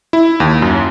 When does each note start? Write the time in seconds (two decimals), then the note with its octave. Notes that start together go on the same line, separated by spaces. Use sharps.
0.13 E4
0.40 D#2
0.62 F#2